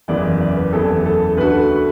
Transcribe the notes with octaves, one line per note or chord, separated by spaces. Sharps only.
F#1 E2 E3 D5
D5
D5
B4
F#1 E2 E3 A4
A4
D2 D3 A3 F#4 A4 B4